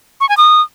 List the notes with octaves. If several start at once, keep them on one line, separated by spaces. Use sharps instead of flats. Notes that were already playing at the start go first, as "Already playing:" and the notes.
C#6
G#5
D#6